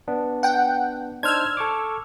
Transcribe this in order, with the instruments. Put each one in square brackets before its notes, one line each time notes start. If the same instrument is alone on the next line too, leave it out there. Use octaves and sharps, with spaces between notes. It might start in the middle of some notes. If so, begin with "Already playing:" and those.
[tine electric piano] B3 D4
[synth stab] F#5 G5
[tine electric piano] D4 D#4 C5 [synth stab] E6 F6 G#6
[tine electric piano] A4 C#6 D6